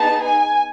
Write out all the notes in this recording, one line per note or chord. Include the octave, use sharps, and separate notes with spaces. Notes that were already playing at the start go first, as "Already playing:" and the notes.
Already playing: B3 D#4 G#4 A5
G#5